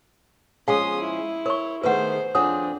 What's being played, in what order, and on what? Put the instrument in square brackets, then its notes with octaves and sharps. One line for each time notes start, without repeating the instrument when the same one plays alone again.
[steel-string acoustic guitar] F3 G#3 C#4 [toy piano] G#4 F5 G#5 [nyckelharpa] C6 D#6
[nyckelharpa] E4
[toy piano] A#4 C#6 [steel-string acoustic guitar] C#5
[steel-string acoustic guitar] D#3 A3 B3 [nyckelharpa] G#4 C5 [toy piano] B4 F#5
[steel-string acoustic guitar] F2 C4 G#4 [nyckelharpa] D4 [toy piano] C#5 F#5 D#6